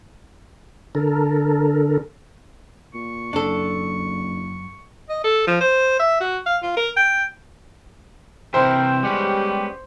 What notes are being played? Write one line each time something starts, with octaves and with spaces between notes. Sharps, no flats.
D3 A4 A#4
A#2 C#6
F#1 F#2 D4 A4
D#5
A4
F3
C5
E5
F#4
F5
F4
A#4
G5
C3 E3 A#4 C5 E5 G5
G3 G#3 B3 C#4 G4